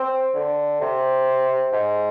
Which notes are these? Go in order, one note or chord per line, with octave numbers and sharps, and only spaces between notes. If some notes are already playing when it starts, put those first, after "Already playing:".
Already playing: C4
D3
C3
G#2